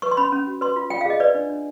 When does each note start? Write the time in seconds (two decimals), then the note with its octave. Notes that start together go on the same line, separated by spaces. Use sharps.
0.02 B4 C#6
0.11 C6
0.17 C#4 B5
0.32 C#4
0.47 F#4
0.61 B4 C6
0.76 F4
0.90 F4 G5
1.01 F5
1.06 G#4 D#5
1.20 B4 D5
1.35 D4
1.50 D4